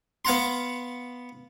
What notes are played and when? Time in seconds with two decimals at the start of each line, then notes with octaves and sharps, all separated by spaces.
0.25 B3 F5 F#5 A#5 C6